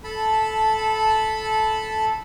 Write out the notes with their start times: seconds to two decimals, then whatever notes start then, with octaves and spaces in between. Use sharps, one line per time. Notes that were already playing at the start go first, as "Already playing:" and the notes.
0.04 A4 A5 B5